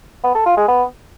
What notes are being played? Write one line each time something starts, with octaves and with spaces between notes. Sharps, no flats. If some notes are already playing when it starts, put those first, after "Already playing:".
B3
A4
F4
G#3
B3